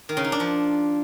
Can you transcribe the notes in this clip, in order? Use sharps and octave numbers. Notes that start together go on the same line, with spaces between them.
D#3
C#3
D#4
D4
F3